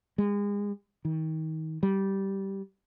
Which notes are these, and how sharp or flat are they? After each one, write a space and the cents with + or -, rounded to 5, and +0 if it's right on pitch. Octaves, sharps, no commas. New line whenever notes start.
G#3 -35
D#3 +30
G3 -10